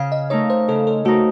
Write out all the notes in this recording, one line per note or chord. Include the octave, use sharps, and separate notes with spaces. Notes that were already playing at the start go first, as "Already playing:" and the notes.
Already playing: C#3 F5
D#5
A3 D#4 A#4 C#5
C5
C#3 A4
A4
A3 D#4 F#4 A#4